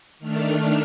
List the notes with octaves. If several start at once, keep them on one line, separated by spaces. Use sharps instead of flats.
D#3 A3 D4 F6